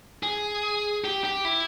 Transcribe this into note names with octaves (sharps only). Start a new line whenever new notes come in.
G#4
G4
G4
E4